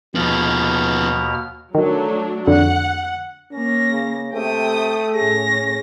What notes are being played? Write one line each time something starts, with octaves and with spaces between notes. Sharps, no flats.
D#2 B2 F3 B3 F6
D#3 F#3 A3 D4
F2 D3 F#5
A#3 C#4 A#6
C#3
C3 A3 G5 D#6
A2 C#4 G#4 A#6